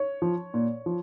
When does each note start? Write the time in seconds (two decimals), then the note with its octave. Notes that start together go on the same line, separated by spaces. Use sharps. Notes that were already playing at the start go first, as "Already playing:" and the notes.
Already playing: C#5
0.22 F3
0.54 A#2
0.86 F3